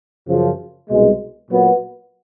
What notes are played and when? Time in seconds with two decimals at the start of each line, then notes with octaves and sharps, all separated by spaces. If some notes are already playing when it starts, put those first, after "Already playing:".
0.29 F#2 C#3 F3
0.89 C2 B2 G#3
1.49 A#2 F#3 B3